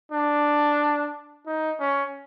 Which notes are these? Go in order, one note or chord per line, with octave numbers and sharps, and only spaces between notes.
D4
D#4
C#4